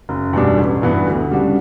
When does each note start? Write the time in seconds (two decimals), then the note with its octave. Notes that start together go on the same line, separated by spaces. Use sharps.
0.09 F#1
0.33 E2 B2 G3 D4
0.58 A1
0.82 G2 E3 B3 F#4
1.06 D2
1.31 C#3 G3 D4 F#4